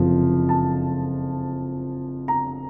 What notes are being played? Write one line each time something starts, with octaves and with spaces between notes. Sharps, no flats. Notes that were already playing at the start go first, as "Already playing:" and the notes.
Already playing: F#1 F2 C3 F3
A5
A#5